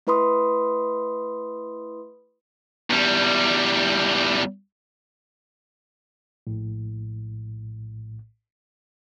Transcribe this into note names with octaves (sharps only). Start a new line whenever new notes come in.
A3 E4 B4 B5 C6 D#6
E2 G3
A#1 A2